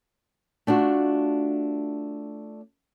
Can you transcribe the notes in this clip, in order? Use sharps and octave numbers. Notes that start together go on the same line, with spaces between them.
A3 D4 F4 F#4